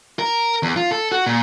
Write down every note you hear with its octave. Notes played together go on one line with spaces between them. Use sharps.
A#4
E2
F4
A4
F#4
A#2